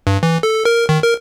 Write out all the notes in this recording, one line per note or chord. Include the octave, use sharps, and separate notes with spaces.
G2
E3
A4
A#4
D#3
A#4